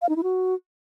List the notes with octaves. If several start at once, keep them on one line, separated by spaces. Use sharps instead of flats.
F5
D#4
E4
F#4